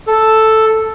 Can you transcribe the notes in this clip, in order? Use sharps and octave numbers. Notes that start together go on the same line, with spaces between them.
A4